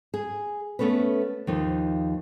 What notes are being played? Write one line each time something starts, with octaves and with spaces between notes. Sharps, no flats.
G#4
A3 B3 C#4 A4 B4
D#2 F3 D#4